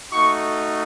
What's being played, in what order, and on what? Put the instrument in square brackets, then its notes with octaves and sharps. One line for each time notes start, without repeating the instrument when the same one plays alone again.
[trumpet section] A3 D#4 F#4 C#6